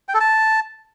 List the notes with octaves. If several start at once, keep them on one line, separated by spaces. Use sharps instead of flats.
G5
A4
A5